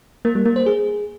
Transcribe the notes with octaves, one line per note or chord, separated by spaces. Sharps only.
A#3
G3
A#3
C5
G#4